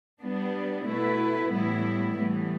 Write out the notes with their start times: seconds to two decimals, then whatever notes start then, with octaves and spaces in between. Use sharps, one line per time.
0.20 G3 B3 D4
0.86 B2 A3 E4 B4
1.50 A2 E3 G3 B3 E4
2.16 A2 E3 G3 B3